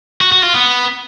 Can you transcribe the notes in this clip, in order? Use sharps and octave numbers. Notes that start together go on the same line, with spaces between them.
F#4
F#4
F4
B3